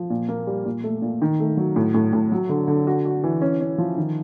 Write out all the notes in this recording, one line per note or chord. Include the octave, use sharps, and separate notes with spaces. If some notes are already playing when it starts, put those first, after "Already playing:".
Already playing: F3
A#2
A#3
G3
A#2
A3
A#2
D#3
A3
F#3
A2
A2
A2
F#3
D3
D3
F#4
F#4
E3
C#4
C#4
F3
D#3